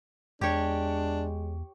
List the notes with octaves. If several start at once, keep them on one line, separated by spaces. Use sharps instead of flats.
E2 G#3 D4 G4 C#5